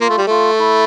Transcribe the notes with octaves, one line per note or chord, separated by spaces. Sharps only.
A#3 F4
A3
G3
A3 F4
E4